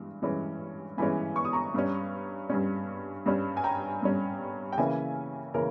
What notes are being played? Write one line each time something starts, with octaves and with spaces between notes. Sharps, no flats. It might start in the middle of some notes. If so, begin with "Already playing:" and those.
Already playing: G2 E3 G#3
G2 E3 G#3 C#4
G2 E3 G#3 C#4 G#5 B5
C#6
D#6
A#5 C#6
G2 G3 C#4
G2 G3 C#4
G2 G3 C#4
G#5
G5 A#5
G2 G3 C#4
G5
C#3 E3 A#3 C#4 E5 G#5
C#3 E3 A#3 A#4 C#5